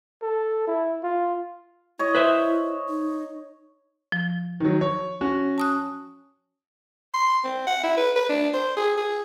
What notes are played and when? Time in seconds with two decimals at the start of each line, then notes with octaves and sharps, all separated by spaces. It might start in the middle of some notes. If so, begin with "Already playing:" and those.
0.22 A4
0.67 E4
1.03 F4
1.99 E4 C#5 D#5
2.15 B4 C5 E5
2.89 D#4
4.12 F3
4.60 D#3 F#3
4.81 C#5
5.21 C#4 F#4
5.58 A5 D#6 F#6
7.14 C6
7.44 C4
7.67 F#5
7.83 E4
7.97 B4
8.16 B4
8.29 D4
8.54 C5
8.76 G#4
8.97 G#4